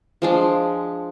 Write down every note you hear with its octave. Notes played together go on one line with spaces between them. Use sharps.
F3 G#3 D4